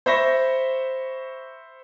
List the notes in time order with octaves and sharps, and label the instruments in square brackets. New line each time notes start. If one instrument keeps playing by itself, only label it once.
[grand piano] C5 E5 B5 C#6 A#6